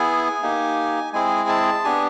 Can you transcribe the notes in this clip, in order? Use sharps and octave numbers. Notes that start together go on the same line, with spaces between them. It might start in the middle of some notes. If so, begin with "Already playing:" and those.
Already playing: B3 E4 G#4 G#5
A#3 D#4 G4
G#3 C4 E4 G#4 G#5
A5
B3 D4 G4 G#5